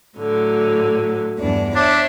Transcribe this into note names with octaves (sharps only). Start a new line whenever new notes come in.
A2 D3 F#3
E2 G2 D4
D4 C#5 E5